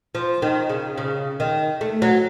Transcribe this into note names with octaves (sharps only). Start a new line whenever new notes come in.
F3
D#3
C#3
C#3
D#3
A3
F#3